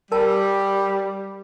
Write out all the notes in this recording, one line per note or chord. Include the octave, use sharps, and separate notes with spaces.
G3 A#4 A5